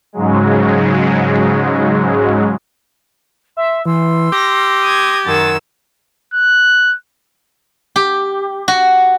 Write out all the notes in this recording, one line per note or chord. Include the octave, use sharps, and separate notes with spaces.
G#2 C#3 F#3 G#3
E5 C6
E3 C6 E6
G4 A#6
D#6 G#6
F#2 D#3 F#5 G#5 C6 E6 A6
F#6
G4
F#4